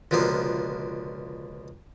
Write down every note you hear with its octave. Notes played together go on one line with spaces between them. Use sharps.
C#2 B2 D3 F3 A#3